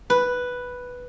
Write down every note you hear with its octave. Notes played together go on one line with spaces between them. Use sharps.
B4